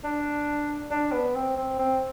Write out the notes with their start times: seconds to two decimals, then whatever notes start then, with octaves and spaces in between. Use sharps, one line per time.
0.04 D4
0.91 D4
1.12 B3
1.35 C4
1.57 C4
1.78 C4